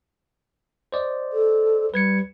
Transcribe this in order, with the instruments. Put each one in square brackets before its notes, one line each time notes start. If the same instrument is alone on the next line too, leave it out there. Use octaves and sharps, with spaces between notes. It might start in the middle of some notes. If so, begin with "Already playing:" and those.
[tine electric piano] C5 D5 D#5
[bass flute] A4
[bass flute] G3 [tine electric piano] B4 G#6 C#7